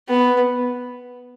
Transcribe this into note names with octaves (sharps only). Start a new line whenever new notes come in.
B3